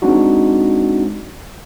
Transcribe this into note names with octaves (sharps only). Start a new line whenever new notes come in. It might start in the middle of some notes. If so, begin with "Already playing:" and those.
G#3 C4 D4 D#4 F#4